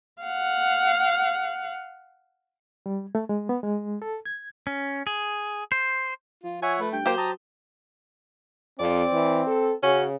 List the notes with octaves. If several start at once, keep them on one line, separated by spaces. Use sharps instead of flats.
F5 F#5
G3
A3
G#3
B3
G#3
A4
G#6
C#4
G#4
C5
F3 F4
C#5 E5 F#5 G#5
A3 B4
G2 G5
F#3 A#3 G4 C5
A5 A#5 D#6
F2 C4 D5
E3
A4
C#3 C#4 F#4